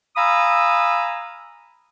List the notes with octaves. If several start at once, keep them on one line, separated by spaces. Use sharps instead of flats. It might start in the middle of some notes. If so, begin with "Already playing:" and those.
F5 G#5 A#5 B5 D#6 E6